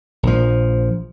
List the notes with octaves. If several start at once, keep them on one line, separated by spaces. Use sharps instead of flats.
A#1 F3